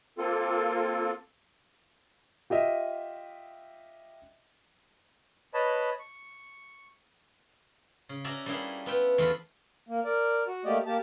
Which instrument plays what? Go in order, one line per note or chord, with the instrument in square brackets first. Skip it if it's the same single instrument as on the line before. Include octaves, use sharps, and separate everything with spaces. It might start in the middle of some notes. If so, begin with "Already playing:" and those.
[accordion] A#3 C4 F4 A4
[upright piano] F4 G4 D#5 E5
[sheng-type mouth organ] B4 C#5 D#5 A5 B5
C#6
[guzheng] C#3
C#4 F#4 D5 E5 A#5
G3 A#3 C#4 D4 E4 G#4
B3 F4 B4 E5 G5
E2 A3 F4 A4 F5 B5
[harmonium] A#3
A#4 D5
F#4
A3 A#3 G4 D5 D#5
A#3 G4 A5